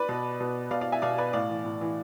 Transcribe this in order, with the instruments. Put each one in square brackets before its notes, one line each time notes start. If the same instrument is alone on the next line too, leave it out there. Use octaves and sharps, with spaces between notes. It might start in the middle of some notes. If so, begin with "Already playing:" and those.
Already playing: [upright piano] B4 D5
B2
B2
B2 D5 F5
D5 F5
E5 G#5
B2 D5 F5
B4 D5
A2 D5 F5
E3
A2
E3